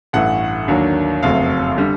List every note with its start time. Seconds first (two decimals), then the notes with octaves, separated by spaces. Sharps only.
0.13 A1 G2 E3 A3 F#5
0.68 D#2 D3 F#3 A#3 D4
1.23 F#1 F2 C#3 F#3 A3 F5
1.78 D3 G3